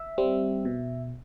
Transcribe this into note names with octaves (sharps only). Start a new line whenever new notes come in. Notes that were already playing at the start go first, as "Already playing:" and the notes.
Already playing: E5
G3 C4
B2